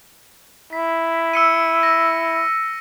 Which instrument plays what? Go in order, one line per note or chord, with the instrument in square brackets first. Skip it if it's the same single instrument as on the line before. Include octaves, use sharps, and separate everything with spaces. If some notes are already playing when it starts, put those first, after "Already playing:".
[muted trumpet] E4 [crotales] B6
[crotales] E6 C#7 D#7
A#6